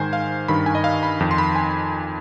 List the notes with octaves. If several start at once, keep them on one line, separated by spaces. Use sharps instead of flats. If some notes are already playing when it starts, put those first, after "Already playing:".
Already playing: G#2 D#3 C5 G#5
F5
G2 D#3 B5
G#5
D#5
F5
B5
F2 D#3
C6
B5
G#5